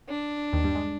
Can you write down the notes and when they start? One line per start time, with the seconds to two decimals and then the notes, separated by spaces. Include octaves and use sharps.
0.09 D4
0.53 D#2 D#3
0.64 G2 G3
0.75 G#3